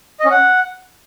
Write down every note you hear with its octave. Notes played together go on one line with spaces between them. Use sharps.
D#5
C#4
F#5